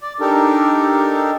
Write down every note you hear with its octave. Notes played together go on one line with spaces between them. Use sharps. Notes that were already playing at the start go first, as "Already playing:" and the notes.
D5
D4 D#4 G4 A4 A#4